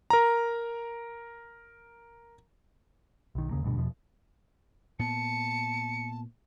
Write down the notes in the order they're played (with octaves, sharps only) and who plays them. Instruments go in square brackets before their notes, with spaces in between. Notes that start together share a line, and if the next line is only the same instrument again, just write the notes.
[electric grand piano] A#4 A#5
[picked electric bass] B1 D#3
D#2 C#3 A#3
A1 D2 G2 B2
E2 B2 F3
[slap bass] A#2 B3 [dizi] A5 [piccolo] C#7